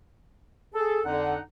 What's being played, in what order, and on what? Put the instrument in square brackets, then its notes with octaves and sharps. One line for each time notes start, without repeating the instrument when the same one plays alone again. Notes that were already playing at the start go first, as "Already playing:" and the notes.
[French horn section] G#4 [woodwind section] A4
[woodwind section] F2 D#4 F#5 [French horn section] D3